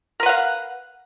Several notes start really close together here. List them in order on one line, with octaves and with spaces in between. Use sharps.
A#4 B4 F#5 F5